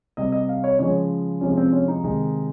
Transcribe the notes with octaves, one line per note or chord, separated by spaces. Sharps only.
C3 G3 D#5
D#5
F5
C#5
C#3 F3 G#3 C#5
C3 F3 G#3 C#4
C#4
C4
C#4
D#4
C3 D#3 G#3